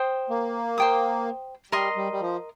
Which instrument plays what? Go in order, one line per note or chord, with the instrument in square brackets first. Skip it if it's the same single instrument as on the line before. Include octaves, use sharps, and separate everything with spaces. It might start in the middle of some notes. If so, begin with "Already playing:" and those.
Already playing: [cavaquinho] C5 G5 D#6
[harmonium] A#3
[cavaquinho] C5 G5 D#6
[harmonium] G3 [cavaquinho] A#4 D#5 C6
[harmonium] G3
G3
F3